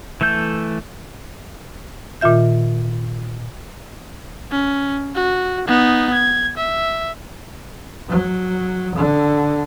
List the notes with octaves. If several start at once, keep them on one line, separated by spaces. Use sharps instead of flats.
E3 A3 A4 G6
A#2 D#3 F4 E5 G6
C#4
F#4
B3 D#4
G#6
E5
F#3
D3